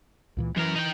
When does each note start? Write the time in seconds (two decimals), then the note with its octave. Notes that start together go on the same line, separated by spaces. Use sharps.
0.37 C#2 A#2 E3
0.57 F#2 E3 A#4
0.76 D#4 G5